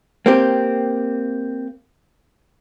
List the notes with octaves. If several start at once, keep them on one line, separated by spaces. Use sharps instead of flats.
A#3 C4 G4